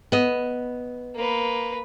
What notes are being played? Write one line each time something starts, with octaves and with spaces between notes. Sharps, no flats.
B3 D#5
A#3 B4